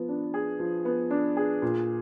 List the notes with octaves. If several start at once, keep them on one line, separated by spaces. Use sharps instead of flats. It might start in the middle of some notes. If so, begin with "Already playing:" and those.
Already playing: F3 B3
D4
G#4
F3
B3
D4
G#4
A#2